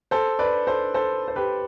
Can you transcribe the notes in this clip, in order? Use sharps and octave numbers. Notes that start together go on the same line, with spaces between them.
A4 C5
B4 D5
A4 C5
A4 C5
C5
G4 B4